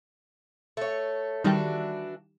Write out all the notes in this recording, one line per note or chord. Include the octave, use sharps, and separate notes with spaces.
A3 C#5
D#3 E3 G3 D4 F#4 G4